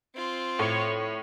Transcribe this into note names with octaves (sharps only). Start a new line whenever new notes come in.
C4 F4
A2 C#5